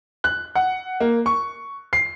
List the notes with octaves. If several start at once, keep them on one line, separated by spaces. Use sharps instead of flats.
F#6
F#5
A#3
C#6
C7